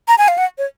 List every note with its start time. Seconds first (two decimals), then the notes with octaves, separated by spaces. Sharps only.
0.08 A#5
0.18 G#5
0.28 F5
0.38 F#5
0.58 C#5